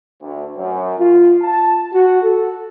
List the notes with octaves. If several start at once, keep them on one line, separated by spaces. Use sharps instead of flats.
D2
F#2
F4
A5
F#4
A4